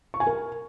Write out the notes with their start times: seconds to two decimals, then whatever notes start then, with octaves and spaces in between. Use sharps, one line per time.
0.14 C#6
0.20 G#5
0.27 A#4